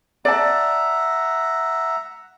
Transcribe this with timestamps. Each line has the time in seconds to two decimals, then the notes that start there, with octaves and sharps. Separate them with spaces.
0.25 D5 E5 F#5 A5 A#5